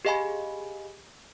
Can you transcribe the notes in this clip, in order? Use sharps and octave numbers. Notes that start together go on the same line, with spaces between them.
G4 G#4 D#5 F5 G#5 B5